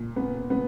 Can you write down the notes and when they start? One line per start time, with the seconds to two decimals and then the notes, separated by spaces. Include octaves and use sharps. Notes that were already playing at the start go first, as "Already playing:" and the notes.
Already playing: A#2
0.16 B3
0.50 B3